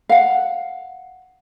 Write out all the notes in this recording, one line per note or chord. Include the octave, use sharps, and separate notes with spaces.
F5 F#5